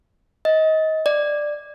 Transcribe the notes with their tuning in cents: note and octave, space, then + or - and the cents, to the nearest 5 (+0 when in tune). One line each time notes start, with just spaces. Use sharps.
D#5 +25
D5 +10